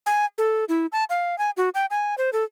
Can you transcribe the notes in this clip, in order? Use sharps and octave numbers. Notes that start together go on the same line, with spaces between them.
G#5
A4
E4
A5
F5
G#5
F#4
G5
G#5
C5
A4